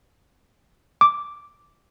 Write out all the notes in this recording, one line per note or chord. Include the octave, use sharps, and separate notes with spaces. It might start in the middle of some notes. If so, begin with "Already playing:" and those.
D6